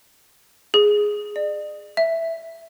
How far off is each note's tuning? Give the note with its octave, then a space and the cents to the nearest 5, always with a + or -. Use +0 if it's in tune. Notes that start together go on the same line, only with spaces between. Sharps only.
G#4 +0
D5 +40
E5 +0